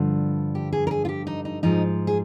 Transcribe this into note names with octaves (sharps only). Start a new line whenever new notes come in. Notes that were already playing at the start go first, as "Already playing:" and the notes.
Already playing: G2 D3 F3
G4
G#4
A#4
G#4
F4
G4
D#4
D#4
G#2 F3 D#4
G#4